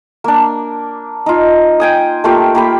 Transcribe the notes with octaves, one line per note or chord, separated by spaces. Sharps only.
A#3 D4
D#4 F4
G5 G#5 D#6
A3 A#3 F4 G4
A#3 G4 B5